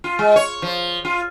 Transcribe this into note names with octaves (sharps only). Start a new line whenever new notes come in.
F4
G#3
C#5
F3
F4